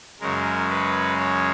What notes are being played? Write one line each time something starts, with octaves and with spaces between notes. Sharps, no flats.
F#2 C#3 G#3 A#4
B4
C#5